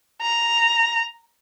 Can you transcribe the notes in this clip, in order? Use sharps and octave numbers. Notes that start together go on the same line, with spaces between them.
A#5